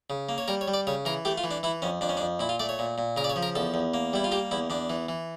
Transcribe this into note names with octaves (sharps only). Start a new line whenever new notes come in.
C#3
A#3
C#5
G3 A#4
C#5
G3
D5
C#3 C#5
E3 A#4
A3 G4
F4
E3
D4
E3 E4
F2 C#4
F2 D4
C#4
D4
F2
A#2 E4
F4
A3 D5
C#5
A#2
A#2
C#3 A#4
D5
C#5
F3
A#4
E2 A4
E2
A#3
G3 E4
F4
A#3 G4
E2 E4
E2 D4
E3
E3